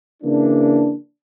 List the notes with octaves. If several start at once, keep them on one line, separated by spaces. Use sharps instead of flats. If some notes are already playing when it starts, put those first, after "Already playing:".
C#3 E3 A#3 D4